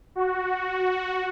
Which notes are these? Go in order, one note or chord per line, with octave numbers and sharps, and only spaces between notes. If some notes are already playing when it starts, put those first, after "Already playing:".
F#4